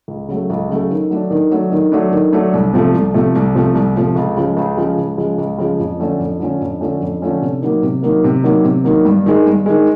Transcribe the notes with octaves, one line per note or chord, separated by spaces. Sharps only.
C#2
C#3 F#3 A3
C#2
C#3 F#3 A3
D#3
F#3 A3 D4
D#3
F#3 A3 D4
D#3
F#3 A3 D4
D#3
F#3 A3 D4
C2
C3 F3 A3
C2
C3 F3 A3
C2
C3 F3 A3
C2
C3 F3 A3
C#2
C#3 F3 G#3
C#2
C#3 F3 G#3
C#2
C#3 F3 G#3
C#2
C#3 F3 G#3
F2
D3 F3 A3 C#4
F2
D3 F3 A3 C#4
F2
D3 F3 A3 C#4
F2
D3 F3 A3 C#4
C3
D#3 F#3 A#3
C3
D#3 F#3 A#3
C3
D#3 F#3 A#3
C3
D#3 F#3 A#3
G2
D#3 G#3
G2
D#3 G#3